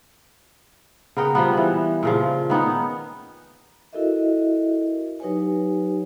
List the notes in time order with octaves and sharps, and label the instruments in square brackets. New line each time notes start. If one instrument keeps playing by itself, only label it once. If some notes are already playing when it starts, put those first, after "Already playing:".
[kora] C#3 B3 A#4 G5
F3 G3 B3
E3
A#2 C#3 F3
D#3 B3 C#4 D#4
[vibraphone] E4 F#4 A4 A#4 D#5 E5
F#3 D#4 G4 B4 C#5 G#5